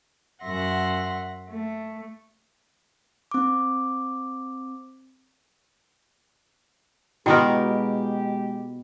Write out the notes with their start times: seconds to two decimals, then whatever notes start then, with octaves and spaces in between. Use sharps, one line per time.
0.42 F#2 E5 F#5 C6 A#6
1.49 A3
3.31 C4 D6
7.26 B2 G#3 B3 E4 F#4 G4 A#4 G5